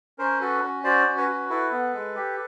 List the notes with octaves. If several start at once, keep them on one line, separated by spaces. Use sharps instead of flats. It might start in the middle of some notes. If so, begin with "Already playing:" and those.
C#4 A#4 C5
F#4 A4 B4
C#4
F#4 C5 D5
C#4
B4 C#5
F#4
E4 A4 B4
B3
G#3
G4